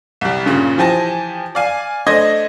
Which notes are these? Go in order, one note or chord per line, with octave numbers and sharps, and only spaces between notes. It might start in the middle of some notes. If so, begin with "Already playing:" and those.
C2 G3
G2 A#2 C#3
E3 F3 G4 G#5 A5 A#6
D5 F5 G#5
A3 D4 C5 D#5 G#6 A#6